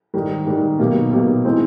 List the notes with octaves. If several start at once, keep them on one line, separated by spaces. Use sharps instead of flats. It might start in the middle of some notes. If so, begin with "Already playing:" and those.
G#2 D#3 G3
G#2 D#3 G3
B2 F#3 A#3 D#4 G4
B2 F#3 A#3 D#4 G4
E3 G#3 C4 D#4